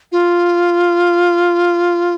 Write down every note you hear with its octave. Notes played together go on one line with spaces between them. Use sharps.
F4